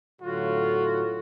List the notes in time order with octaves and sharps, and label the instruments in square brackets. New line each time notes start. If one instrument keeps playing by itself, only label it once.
[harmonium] A2 D3 F#3 [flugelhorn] F4 [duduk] F#4